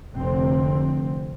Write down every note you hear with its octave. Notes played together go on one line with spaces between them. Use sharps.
F1 D3 C4